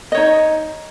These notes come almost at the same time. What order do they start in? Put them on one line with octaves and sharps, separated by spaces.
D#5 C#5 D#4